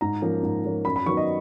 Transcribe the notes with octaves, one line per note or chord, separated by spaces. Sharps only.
G#2 A#5
F3 A#3 C#4
G#2
F3 A#3 C#4
F#2 B5
B5
D#3 F#3 B3 C#6
D#5